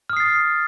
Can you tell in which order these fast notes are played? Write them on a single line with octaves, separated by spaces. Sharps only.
F6 D#6 C7 A6